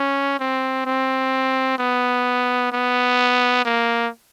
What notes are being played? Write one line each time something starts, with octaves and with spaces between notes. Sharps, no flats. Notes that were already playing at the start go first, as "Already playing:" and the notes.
Already playing: C#4
C4
C4
B3
B3
A#3